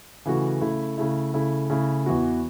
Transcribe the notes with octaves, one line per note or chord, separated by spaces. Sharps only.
C#3 E3 A3 F#4
C#3 A3 E4
C#3 A3 E4
C#3 A3 E4
C#3 A3 E4
E2 E3 B3 F#4